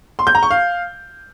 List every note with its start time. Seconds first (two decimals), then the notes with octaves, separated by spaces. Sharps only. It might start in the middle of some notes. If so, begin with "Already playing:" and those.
0.19 C6
0.27 G6
0.35 A#5
0.43 C#6
0.51 F5